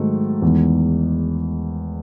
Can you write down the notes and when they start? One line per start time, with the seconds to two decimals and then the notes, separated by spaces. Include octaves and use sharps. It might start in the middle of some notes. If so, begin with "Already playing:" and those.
Already playing: G#2 D#3 F#3 A3
0.42 E2 D#3 G#3